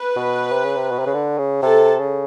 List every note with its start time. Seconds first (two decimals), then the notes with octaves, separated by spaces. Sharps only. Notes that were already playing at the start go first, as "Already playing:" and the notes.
Already playing: B4
0.16 B2
0.52 C3
0.64 C#3
0.76 C3
0.91 B2
0.99 C3
1.06 C#3
1.14 D3
1.38 C#3
1.63 C3 A4
1.99 C#3